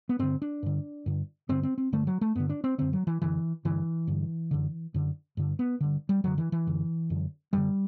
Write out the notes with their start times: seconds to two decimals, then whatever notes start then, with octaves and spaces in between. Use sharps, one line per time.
0.09 B3
0.19 G2 D3 C4
0.42 D4
0.63 G2 D3
1.06 G2 D3
1.49 G2 D3 C4
1.63 C4
1.78 C4
1.92 G2 D3 A3
2.07 F#3
2.21 A3
2.36 G2 D3 B3
2.49 D4
2.64 C4
2.78 F#2 D3 C4
2.93 F#3
3.07 E3
3.22 F#2 D3 E3
3.65 G2 D3 E3
4.07 G2 D3
4.51 F#2 D3
4.94 F#2 D3
5.37 G2 D3
5.59 B3
5.81 G2 D3
6.09 G3
6.24 F#2 D3 F#3
6.38 E3
6.52 E3
6.67 F#2 D3
7.10 F#2 D3
7.53 F#2 D3 G3